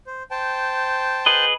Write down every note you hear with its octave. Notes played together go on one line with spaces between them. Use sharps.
C5
C5 G5 A5
G#4 B4 D#5